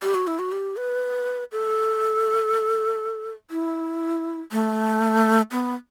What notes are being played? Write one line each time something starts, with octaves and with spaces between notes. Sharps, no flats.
G4
F#4
E4
F#4
G4
B4
A4
E4
A3
B3